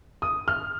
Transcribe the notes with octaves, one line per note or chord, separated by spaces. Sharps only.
D#6
F6